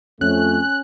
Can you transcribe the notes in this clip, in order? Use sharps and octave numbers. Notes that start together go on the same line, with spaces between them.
F2 A3 C#4 F#6